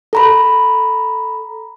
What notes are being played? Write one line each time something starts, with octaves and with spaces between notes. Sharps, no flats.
A4 A#5 B5